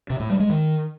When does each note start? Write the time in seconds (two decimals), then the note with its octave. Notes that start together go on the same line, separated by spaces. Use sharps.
0.10 C3
0.20 A2
0.30 G3
0.40 G#3
0.50 D#3